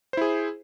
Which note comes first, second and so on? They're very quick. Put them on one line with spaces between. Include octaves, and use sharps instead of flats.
C5 E4 G#4